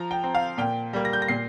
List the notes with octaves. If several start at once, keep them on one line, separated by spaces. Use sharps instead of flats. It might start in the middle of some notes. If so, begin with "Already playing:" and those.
Already playing: F3 A#5
G5
C4
F5
A#2 G5
G3 A#3
A#6
G6
A#6
A#2 C7